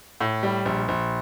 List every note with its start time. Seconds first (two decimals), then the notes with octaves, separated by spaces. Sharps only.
0.21 A2
0.43 G3
0.65 A#1
0.88 A#1